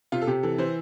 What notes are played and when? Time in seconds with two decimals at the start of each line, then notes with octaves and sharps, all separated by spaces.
0.12 C3 F4
0.22 A4
0.27 C3 G4
0.43 E3 A4
0.58 E3 C5